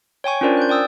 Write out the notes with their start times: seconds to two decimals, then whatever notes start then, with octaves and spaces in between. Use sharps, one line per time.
0.24 C#5 G5 G#5 C#6
0.41 C#4 D4 F4 A#4 C5 D5
0.57 F#6 G6
0.69 D5 G5 D#6 E6